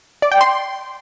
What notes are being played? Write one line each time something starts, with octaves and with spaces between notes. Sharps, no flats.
D5
G5
C6